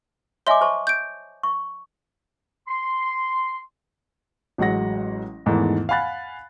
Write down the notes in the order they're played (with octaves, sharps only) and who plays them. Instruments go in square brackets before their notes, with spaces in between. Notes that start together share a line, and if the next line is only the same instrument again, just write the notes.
[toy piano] C#5 G#5 D6 [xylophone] D#5 E5 C6
[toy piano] C5 A5 C#6
[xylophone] G6 D7
[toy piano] C#6
[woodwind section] C6
[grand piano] A1 F#3 G#3 F#5 A#6
E2 G#2 D#3 E3 A3
F5 F#5 G#5 B5 F#6 A6